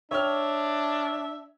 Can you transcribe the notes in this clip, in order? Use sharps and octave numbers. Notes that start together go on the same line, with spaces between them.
D4 C#5 E5 G5 F6